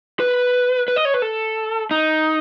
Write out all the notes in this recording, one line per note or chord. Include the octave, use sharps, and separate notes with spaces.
B4
B4
D#5
C#5
B4
A4
D#4